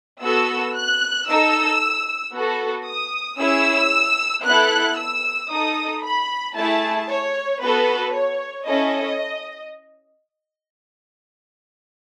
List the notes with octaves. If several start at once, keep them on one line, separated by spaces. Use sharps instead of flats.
B3 F#4 A4 E6
F#6
D#4 A4 E6
B3 F#4 A4
D#6
C#4 E4 G#4 E6
B3 E4 A4 F#6
E6
D#4 A4 D#6
B5
A3 E4 G#4 A5
C#5
B3 F#4 A4 B4
C#5
C#4 E4 A4 D#5